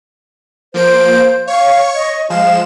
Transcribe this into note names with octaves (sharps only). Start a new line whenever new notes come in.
F3 A#3 C5 D7
C#5 F5 C#6
D#5
F3 G#3 F5 E7